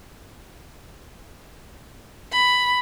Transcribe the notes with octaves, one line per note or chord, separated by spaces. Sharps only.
B5